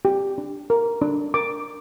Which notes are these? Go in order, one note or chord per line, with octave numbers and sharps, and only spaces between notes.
G4
D4
A#4
D4
A#4 D6